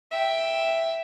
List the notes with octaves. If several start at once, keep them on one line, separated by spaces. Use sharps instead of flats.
E5 G5